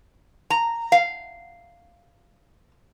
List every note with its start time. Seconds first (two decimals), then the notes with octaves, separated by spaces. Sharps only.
0.50 A#5
0.92 F5